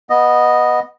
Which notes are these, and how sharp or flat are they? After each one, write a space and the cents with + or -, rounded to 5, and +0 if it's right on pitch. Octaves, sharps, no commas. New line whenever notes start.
B3 -15 D#5 -5